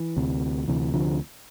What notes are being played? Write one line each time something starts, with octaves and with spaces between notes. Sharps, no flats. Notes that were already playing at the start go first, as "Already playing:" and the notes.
Already playing: E3
D2 C3
D2 C3 E3
D3 F3